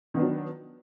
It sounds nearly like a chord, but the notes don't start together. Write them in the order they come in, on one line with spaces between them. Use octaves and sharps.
D#3 B3 D4 F#3